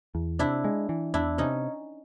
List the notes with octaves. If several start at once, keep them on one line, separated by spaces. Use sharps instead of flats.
E2
C3 D4 E4
G#3
E3
E2 D4 E4
C3 C#4 D#4